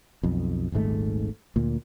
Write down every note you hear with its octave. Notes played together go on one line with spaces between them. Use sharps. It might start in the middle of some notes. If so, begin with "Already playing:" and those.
B1 F2
D#1 G#1 G#2 A3
D2 A#2